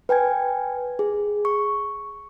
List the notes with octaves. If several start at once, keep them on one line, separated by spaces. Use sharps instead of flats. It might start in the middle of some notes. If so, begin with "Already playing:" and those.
B4 G5 G#5 G#6
G#4
C#6